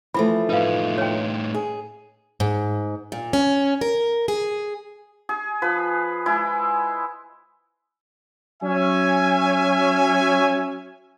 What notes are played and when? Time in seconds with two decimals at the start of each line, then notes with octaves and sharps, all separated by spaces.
0.14 E3 F3 A3 B5
0.49 A2 D#4 B4 F5
0.98 C#5 G5
1.54 G#4
2.40 G#2
3.12 A#2
3.33 C#4
3.81 A#4
4.28 G#4
5.29 G#4
5.62 F3 B4
6.26 G#3 E4
8.63 F#3 C#4 E5 G#5